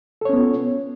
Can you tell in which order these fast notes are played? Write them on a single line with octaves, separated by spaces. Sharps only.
A4 C#5 C#4 B3 F4